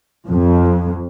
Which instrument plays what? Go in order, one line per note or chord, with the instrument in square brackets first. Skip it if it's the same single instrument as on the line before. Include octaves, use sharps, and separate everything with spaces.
[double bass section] F2